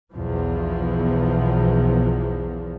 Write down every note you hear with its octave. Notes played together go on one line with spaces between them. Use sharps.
B1 E2 F3